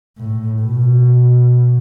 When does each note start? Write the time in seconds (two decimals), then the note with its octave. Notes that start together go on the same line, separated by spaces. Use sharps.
0.17 A2
0.62 B2